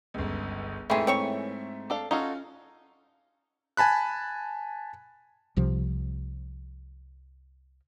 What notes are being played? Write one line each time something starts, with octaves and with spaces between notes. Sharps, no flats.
G1 C#2
G#2 E3 A3 C4 C#4 E4 G#4
C4 C#5 C#6
D4 A4 F5
C#4 D#4 F4 F#4 A4
G#5 A5 B5 F#6
C2 C3 F3